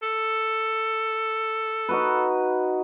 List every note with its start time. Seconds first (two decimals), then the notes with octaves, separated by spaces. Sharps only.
0.02 A4
1.89 D#4 F#4 B4